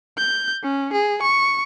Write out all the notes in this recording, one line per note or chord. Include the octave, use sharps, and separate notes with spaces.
G6
C#4
G#4
C#6